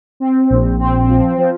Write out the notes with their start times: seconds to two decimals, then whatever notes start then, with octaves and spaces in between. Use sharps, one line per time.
0.20 C4
0.50 A#1
0.79 C4
1.09 F3
1.38 F3